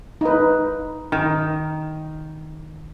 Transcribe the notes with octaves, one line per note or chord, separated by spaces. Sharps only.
D#4 B4
D#3